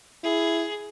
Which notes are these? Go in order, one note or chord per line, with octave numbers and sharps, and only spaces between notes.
E4 G#4